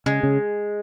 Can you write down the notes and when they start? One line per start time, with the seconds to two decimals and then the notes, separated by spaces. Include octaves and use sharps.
0.06 C#3 G#3
0.23 C#3